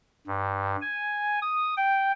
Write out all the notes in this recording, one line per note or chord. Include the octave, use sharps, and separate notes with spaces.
G2
G#5
D#6
G5